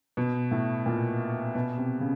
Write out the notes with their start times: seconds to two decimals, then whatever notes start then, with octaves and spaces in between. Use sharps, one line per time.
0.17 B2
0.51 A2
0.86 A#2
1.55 B2
1.78 C3
2.00 C#3